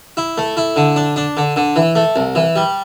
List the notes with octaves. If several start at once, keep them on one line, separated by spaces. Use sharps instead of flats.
E4
A3
E4
D3
D4
D4
D3
D3
E3
A3
C2
E3
G3